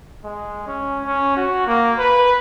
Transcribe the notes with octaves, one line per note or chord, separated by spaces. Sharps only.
G#3
C#4
C#4
F#4
A#3
B4